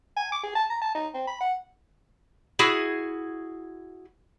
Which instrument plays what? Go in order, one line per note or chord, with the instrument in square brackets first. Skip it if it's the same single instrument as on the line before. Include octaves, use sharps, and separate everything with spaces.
[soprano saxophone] G#5
D6
G#4
A5
A#5
A5
D#4
C4
B5
F#5
[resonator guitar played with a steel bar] E4 F#4 G#4